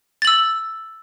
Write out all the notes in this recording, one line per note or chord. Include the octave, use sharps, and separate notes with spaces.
E6 A6 F#7